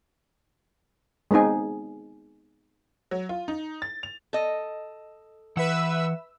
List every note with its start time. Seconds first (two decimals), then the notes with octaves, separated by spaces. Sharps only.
1.31 G#3 B3 C4 D#4 G#4
3.11 F#3
3.29 F4
3.48 D#4
3.82 A6
4.03 F7
4.33 A4 D#5
5.57 E3 B4 E5 F#5 E6